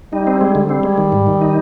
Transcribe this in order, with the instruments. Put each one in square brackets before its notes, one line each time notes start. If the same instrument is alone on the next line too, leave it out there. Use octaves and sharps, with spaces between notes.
[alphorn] G3 [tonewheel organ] D#4
[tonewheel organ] C4
G#3
D3
[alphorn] G3 [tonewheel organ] C4
[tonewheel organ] G#3
D#3
G#2
D#3
D#4